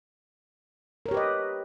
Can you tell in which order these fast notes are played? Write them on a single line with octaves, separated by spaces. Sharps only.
A#4 C#5 G4 B4 D#5